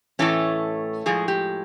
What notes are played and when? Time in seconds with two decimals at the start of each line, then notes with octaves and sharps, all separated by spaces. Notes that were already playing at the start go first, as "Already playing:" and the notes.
0.19 A2 E3 A3 C#4 A4
1.06 A2 F3 G#3 G#4
1.28 G4